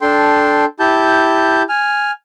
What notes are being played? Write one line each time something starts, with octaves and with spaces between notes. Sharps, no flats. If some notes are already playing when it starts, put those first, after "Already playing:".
D4 A4 G5 C6
E4 G4 A5 G6
G#5 F6